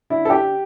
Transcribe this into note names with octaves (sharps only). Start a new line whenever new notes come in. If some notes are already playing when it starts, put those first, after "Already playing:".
D3 E4
A4
G4